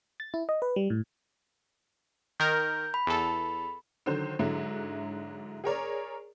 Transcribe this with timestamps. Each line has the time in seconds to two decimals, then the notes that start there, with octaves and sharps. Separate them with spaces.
0.20 A6
0.34 E4
0.49 D#5
0.62 B4
0.76 G3
0.90 A2
2.40 D#3 A#4 G6
2.94 B5
3.07 E2 A4
4.06 D3 D#3 F#3 C5
4.39 G#2 D3 F#3 E4
5.64 G#4 A#4 C#5 D5